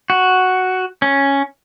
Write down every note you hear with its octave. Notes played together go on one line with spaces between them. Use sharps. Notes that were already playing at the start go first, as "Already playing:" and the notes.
F#4
C#4